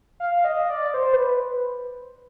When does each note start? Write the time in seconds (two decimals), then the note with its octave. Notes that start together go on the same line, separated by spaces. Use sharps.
0.20 F5
0.44 D#5
0.70 D5
0.94 C5
1.13 B4